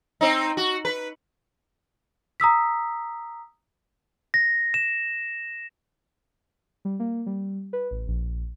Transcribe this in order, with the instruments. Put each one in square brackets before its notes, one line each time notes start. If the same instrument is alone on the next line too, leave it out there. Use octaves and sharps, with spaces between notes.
[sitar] C4 D#4
F#4
B4
[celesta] A#5 D#6 E6 B6
[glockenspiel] A#6
E7
[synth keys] G3
A#3
G3
B4
A1
A#1